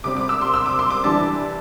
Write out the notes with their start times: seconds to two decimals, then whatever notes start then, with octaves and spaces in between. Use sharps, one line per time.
0.04 C3 G3 C4 D6
0.16 D6
0.29 E6
0.41 C6
0.54 E6
0.66 D6
0.79 C6
0.90 D6
1.04 E3 G3 D4 A5